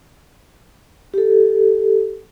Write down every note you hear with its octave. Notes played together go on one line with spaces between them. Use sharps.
G4 A4